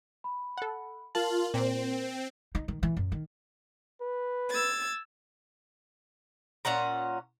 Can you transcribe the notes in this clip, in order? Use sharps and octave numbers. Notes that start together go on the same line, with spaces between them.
B5
A4 F#5
F4 A#4 A5 F#7
A#2 C4
D#4
D#3
E3
F#2
D#3
B4
E6 G#6 A6
A#2 C#4 F#5 A#5